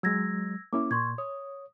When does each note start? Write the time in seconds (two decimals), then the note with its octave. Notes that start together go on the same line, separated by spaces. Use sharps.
0.03 F#3 G#3 E6 G#6 A#6
0.73 A#3 C#4 E4 D6
0.91 A#2 C6 C#6 G#6
1.18 C#5 D#6